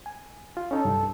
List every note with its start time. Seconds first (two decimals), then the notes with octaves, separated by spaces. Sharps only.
0.06 G#5
0.57 F4
0.71 C#4 D#4 A4 C#5
0.85 C2 G2